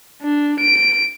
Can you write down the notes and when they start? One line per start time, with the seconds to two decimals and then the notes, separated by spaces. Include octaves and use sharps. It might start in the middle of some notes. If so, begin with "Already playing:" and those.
0.22 D4
0.60 D7